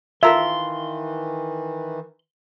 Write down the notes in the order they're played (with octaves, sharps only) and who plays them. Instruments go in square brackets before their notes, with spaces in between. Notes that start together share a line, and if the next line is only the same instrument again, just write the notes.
[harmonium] D#3 E3 [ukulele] F4 A#4 [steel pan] E5 [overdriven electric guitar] C6